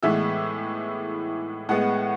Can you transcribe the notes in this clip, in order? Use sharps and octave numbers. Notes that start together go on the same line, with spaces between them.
A2 E3 G#3 B3 E5
A2 G#3 B3 F#5